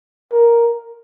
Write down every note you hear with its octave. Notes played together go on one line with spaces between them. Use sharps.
A#4